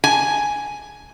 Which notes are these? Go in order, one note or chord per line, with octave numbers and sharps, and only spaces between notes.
G#5